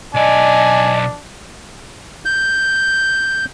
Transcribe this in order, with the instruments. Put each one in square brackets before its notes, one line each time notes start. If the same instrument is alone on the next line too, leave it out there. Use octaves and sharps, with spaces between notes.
[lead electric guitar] B1 D5 [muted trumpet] D4 [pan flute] D#5 [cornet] G#5
[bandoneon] G6